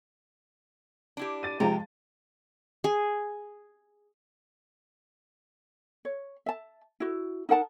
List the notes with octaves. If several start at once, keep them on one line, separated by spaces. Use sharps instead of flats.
D4 E4 G4
A6 D#7
C3 F3 G#3 G4 A#5
G#4
C#5
E5 A5
E4 F#4
D#4 A#4 F#5 A5